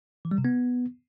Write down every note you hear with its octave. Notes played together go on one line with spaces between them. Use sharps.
E3
G3
C3
B3